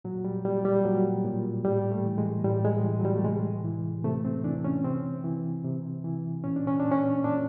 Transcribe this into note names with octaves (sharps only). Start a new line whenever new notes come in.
A#2 F#3
G3
A#2 G3
G3
A#2 F#3
A#2
A2 G3
A3
E3
G#3
A2 G3
G#3
E3
F#3
G3
A3
C3 G#3
E3
C3 A3
C4
E3 D4
C#4
C3 C4
E3
C3
E3
A#2 C#4
D4
C#4
A#2 D4
C#4
A#2 D4